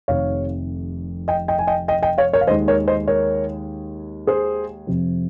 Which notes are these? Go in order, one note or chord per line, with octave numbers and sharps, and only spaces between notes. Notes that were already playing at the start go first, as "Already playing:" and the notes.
F1 F2 C3 D#3 C#5 F5
D#5 G5
D#5 G5
G#5
D#5 G5
D#5 G5
D#5 G5
C#5 F5
A#4 C#5
F5
D#2 D#3 G#3 C5 D#5
A#4 C#5
C5 D#5
A#4 C#5
G#4 C5
F2 C3 F3